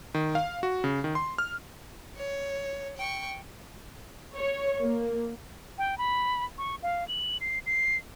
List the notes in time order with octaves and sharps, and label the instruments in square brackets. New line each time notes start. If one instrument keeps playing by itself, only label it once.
[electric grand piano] D#3
F5
F#4
C#3
D#3
C6
F6
[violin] C#5
G5 C#6
[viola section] C#5
A#3
[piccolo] G5
B5
C#6
F5
F#7
C7
C7